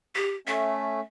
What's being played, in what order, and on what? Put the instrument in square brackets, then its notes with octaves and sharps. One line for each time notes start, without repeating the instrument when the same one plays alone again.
[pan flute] G4
[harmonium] A3 C#4 [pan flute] E5